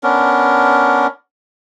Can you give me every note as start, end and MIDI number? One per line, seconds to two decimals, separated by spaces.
0.03 1.07 59
0.03 1.07 61
0.03 1.07 62
0.03 1.07 70